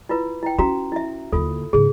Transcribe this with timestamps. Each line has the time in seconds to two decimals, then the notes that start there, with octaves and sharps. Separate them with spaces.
0.09 E4 F4 B4
0.43 E4 G5
0.59 C#4 F#4 A#5
0.92 E4 E5
1.32 D#2 D3 F4 A4
1.73 G#2 C#3 G#4